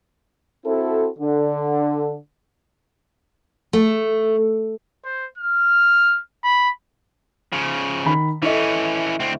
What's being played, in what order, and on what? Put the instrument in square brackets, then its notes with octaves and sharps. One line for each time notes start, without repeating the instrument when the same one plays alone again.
[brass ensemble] C4 E4 F#4 A4
D3
[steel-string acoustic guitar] A3
[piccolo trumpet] C5
F6
B5
[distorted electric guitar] C#3 F3
[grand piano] D#3 B5
[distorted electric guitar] E3 C#4 [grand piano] E4 A4 D#5
[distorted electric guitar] D2 C4